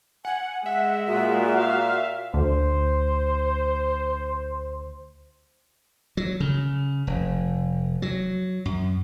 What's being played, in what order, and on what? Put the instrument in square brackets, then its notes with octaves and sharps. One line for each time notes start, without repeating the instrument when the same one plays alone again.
[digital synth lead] F#5 [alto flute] G#5
[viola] G#3 [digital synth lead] E5 [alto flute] F#5
[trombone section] A#2 [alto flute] F#4
[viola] F5
[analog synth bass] D2 [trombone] C5
[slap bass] F#3
C#3
F1
F#3
F#2